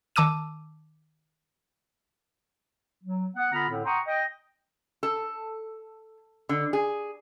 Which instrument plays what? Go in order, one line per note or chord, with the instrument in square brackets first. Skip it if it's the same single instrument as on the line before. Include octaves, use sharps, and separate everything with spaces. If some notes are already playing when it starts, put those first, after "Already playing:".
[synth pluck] D#3 A5 D6 E6 D#7
[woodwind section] F#3
B3 F#5
D3 B3 F4 A#5 B5 F6
A2 D3 C4
F#5 G5 A#5 C6 C#6 D#6
D#5 G5
[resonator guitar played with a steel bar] A4
D3
G#4